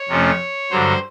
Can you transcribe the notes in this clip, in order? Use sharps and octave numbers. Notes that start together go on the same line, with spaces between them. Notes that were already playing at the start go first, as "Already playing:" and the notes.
Already playing: C#5
F2 C3 F3 A3 C#4
G2 D3 F#3 C5